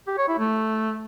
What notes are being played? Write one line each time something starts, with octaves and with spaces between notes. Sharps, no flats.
G4
C#5
E4
A3